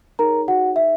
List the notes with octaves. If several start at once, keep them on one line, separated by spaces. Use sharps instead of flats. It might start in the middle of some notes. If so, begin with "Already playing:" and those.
D#4 G#4 A#4 C#5 A#5
F#4 F#5
E5